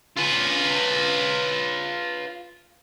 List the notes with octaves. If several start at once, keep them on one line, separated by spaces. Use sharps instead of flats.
F4 B4